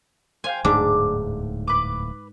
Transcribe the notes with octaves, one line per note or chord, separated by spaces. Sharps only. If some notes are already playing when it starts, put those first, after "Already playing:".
C5 F5 G5 G#5
D1 E2 G#2 A3 D4 D6
B4 D6